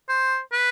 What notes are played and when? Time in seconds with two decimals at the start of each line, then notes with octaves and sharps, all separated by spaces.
0.09 C5
0.53 B4